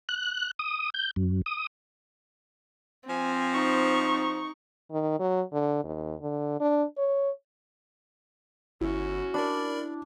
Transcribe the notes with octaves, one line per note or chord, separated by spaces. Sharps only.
F#6
D#6
G6
F#2
D#6
F3 C4 G#5
D#4 C#6
D#3
F#3
D3
D#2
D3
D4
C#5
G1 C#4 E4 F#4
D4 A#4 D5 B5